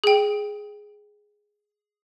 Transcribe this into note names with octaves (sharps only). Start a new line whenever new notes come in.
G#4 G5